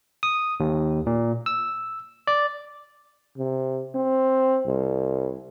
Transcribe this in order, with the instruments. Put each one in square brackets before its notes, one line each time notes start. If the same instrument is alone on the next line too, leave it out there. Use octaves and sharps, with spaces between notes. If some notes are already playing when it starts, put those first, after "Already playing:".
[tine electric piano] D#6
D#2
A#2
E6
D5
[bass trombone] C3
C4
C2